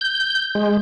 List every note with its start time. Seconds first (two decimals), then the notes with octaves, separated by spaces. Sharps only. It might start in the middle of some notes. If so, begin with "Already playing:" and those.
0.01 G6
0.55 G#3